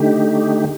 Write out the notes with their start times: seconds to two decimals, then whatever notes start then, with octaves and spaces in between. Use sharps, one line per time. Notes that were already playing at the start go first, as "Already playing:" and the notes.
Already playing: D3 A3 D#4 G4